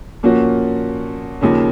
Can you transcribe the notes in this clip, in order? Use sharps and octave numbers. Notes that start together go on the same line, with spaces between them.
A#2 F3 A#3 C#4 F#4
D#2 C#3 F3 A#3 C#4